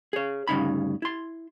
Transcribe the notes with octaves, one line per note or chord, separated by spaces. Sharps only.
G#4 C#5
D2 G2 C#3 D#4 B5
E4 C6